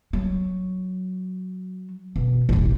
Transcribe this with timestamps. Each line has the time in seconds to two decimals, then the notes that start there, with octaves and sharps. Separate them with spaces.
0.13 F#3
2.16 B2
2.49 E1 A1